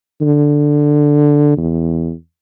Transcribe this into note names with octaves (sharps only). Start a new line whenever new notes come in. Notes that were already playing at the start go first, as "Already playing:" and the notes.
D3
E2